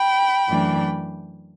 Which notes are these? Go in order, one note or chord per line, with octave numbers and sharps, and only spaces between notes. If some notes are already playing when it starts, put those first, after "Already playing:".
Already playing: G5 B5
F#2 E3 A3 D4